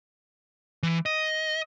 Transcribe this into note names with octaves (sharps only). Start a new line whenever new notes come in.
E3
D#5